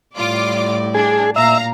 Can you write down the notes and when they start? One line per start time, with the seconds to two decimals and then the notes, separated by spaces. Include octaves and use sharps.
0.16 A2 G3 F4 D5 D6
0.95 D4 G#4
1.36 A#2 E5 F5 A#5